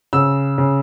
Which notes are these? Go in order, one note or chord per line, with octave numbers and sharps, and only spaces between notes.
C#3 E6
C#3